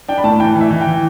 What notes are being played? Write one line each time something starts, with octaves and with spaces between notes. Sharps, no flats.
D4 G5
B5
A2 A5
E3 G5
E3
E5
E3
G5
E3